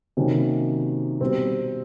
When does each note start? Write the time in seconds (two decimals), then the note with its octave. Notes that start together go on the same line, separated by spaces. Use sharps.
0.17 C3 D#3 F#3 A#3 C#4
1.20 B2 G3 C4